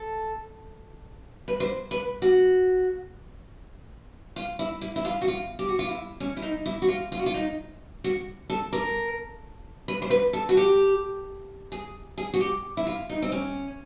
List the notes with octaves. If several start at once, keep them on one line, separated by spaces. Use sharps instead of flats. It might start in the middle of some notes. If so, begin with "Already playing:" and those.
Already playing: A4
B4
C5
B4
F#4
F4
E4
E4
E4
F4
F#4
F4
G4
F#4
F4
E4
C#4
E4
D#4
E4
F#4
F4
F4
F#4
F4
D#4
F#4
A4
A#4
B4
C5
B4
A4
F#4
G4
G#4
G#4
F#4
G4
E4
F4
D#4
C4
C#4